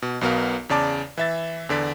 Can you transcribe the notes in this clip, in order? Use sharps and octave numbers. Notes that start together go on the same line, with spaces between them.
B2
B1 B2 B3 A#4 F5
E2 C#3 D5 A5 D6
E3 E5 A6
E2 D3 D5 B6